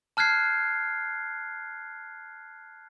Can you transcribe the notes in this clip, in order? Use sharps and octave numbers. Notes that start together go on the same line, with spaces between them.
A5 F6 F#6 G#6 C7